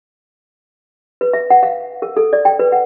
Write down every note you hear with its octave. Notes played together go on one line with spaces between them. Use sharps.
B4
E5
F#5
F5
A#4
A4
D5
G5
B4
F#5